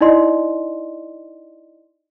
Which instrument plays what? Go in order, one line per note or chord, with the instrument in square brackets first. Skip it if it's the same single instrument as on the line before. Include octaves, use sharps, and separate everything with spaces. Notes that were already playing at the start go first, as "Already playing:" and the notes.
[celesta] D#4 E4 D5 D#5 C6